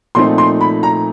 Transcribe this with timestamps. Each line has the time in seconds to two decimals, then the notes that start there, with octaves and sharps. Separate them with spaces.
0.15 A#2 F3 A3 C4 D#4 C6
0.38 C6
0.61 B5
0.83 A#5